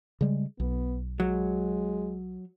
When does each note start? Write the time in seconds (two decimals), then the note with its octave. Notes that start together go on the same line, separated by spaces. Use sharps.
0.21 C#3 G3 G#3
0.60 B1 B3
1.20 F#3 G#3